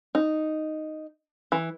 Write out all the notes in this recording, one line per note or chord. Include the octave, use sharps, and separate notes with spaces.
D#4
E3